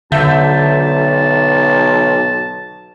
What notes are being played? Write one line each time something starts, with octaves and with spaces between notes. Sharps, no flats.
B1 D3 E5 A5 G6